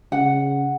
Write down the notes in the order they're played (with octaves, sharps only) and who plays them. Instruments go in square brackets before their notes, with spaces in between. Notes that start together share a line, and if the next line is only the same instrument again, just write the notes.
[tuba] C#3 [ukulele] F#5